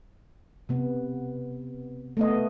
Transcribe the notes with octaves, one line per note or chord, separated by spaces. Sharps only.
C3 B3
A3 B3 D#5